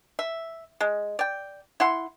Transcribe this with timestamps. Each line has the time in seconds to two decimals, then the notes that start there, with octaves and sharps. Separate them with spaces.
0.19 E5
0.81 G#3
1.19 D5 G5
1.80 E4 F#5 C6